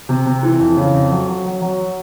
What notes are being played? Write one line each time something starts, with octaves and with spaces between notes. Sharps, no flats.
C3
C3
E3
F2
C#3
F2
F#3
F#3
F#3
F#3